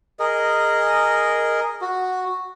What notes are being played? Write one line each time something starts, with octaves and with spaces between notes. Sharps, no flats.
G#4 A#4 D#5
F#4